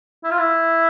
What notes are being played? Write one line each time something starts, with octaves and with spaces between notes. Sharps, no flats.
E4
F4
E4